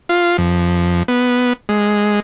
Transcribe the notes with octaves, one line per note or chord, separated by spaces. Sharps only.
F4
F2
B3
G#3